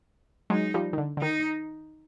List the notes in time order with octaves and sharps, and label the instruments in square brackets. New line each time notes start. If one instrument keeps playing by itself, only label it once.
[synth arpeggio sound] F#3 G#3 [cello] D#4
[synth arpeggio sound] F3 G3
D#3
D3
D3
[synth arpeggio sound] D#3 [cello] D#4